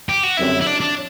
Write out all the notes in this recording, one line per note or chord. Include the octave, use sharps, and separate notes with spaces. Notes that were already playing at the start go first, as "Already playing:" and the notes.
G4
F#4
F#2 D3 G3 C4 E4
E4
D4
D4